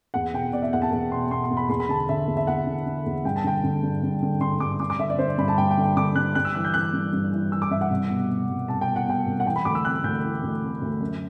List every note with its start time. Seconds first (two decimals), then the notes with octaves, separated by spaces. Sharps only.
0.14 E2 F#5
0.33 B2 G5
0.53 B2 D5
0.62 E5
0.73 E2 F#5
0.82 A5
0.92 E2
1.12 B2 C6
1.31 B2 C6
1.44 C6
1.51 E2
1.57 B5
1.69 E2 C6
1.80 B5
1.89 D3 A5
2.09 D3 E5
2.28 E2
2.37 E5
2.47 E2 F#5
2.66 D3
2.86 D3
3.06 E2
3.25 G2 G5
3.36 A5
3.44 D3 G5
3.64 D3
3.83 G2
4.03 G2
4.23 D3
4.41 D3 C6
4.60 G2 D6
4.80 G2 D6
4.90 D6
4.99 D3 E5
5.10 D5
5.19 D3 C5
5.28 D5
5.38 G2 B5
5.48 A5
5.57 G2 G5
5.71 G5
5.78 D3
5.83 G5
5.96 D3 D6
6.15 G2 F#6
6.35 G2 F#6
6.45 E6
6.55 E3 F#6
6.64 G6
6.74 E3 F#6
6.93 G2
7.13 G2
7.32 E3
7.52 E3 E6
7.62 D6
7.71 G2 E5
7.81 F#5
7.90 C2
8.09 B2
8.30 B2
8.49 C2
8.68 C2 A5
8.81 G5
8.87 B2
8.96 F#5
9.07 B2 G5
9.26 C2
9.40 F#5
9.46 E3 G5
9.56 B5
9.65 D2 D6
9.75 E6
9.85 C3 F#6
10.04 D2 G6
10.24 E3
10.43 D2
10.62 C3
10.81 D2
11.01 F#2